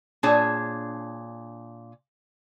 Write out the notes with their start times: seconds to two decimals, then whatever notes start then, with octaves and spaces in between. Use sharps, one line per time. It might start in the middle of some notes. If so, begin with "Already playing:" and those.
0.23 A#2 D4 G#4 C#5 A5